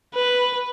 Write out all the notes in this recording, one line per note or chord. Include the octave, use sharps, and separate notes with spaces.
B4